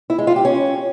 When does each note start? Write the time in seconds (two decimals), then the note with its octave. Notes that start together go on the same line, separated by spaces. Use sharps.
0.10 E4
0.18 G#3
0.27 F4
0.36 G4
0.45 C#4